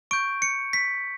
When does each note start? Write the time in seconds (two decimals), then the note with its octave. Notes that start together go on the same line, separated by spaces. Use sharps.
0.11 C#6 G6 D7
0.42 C#7
0.73 B6